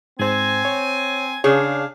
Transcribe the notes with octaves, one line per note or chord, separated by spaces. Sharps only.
G#2 C4 C5 G#5
C#5
C#3 D4 G#4 C#5 F5